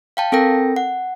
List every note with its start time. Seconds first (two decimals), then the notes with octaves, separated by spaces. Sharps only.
0.17 F5 G5 A5
0.32 C4 A4 A#4 G5 A#6
0.76 F#5